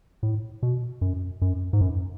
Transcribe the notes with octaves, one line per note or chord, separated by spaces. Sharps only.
A2
B2
F#2
F#2
G#2
F#2